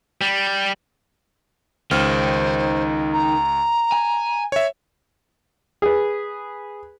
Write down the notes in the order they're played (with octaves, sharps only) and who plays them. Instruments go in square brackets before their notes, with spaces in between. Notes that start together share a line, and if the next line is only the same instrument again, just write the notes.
[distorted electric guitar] G3
[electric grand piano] C#2 F6 [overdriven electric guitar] D#3 [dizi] C5
[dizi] A#5
[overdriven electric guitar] G#5
[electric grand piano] C#5 E5
[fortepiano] G#4 B4